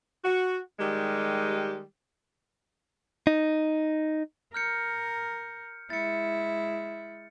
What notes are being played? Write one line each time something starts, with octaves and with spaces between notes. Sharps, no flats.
F#4
D#3 G3 G#3 G4
D#4
A#4 F6 G6 C#7
G#3 E4 A6 C#7